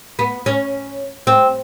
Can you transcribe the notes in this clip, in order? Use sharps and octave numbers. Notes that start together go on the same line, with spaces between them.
B3
C#4
C4